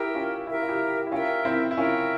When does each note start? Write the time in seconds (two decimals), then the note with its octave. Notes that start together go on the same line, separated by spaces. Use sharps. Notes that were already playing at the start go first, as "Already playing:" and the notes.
Already playing: E4 G4 A#4 E5 G5
0.14 C#4 F4
0.47 E4 G4 A#4 E5 G5
0.62 F4
0.68 E4 G4
1.07 E4
1.11 C#4 F4 A#4 E5 G5
1.45 C4 E4
1.71 E4
1.77 C#4 F4 A#4 E5 G5